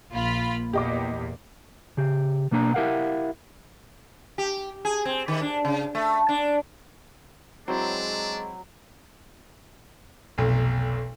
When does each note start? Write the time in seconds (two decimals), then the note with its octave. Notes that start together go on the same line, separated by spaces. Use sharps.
0.11 A#1 A#3 F4 B5
0.73 E2 A#2 G4 D#5 D6
1.97 C#3 G4
2.51 B2 A#3 D4 C5 A#5
2.74 E4 G4 A#4 F5 F#5
4.38 G4
4.85 G#4
5.05 C4
5.28 D#3
5.41 D4
5.65 C#3
5.95 A3
6.29 D4
7.68 F#3 G#3 C4 D4 E4 C5
10.38 F1 B1